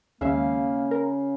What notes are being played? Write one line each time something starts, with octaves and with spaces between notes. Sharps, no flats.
D#2 C#3 G#3 A#3 E5 F5
A#4